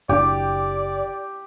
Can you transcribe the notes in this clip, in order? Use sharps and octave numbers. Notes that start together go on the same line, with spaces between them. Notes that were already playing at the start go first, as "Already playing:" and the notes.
F#1 D4 G4 D5